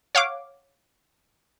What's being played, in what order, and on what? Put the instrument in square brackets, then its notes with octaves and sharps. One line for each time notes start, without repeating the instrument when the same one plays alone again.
[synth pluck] C#5 F5 F#5 D6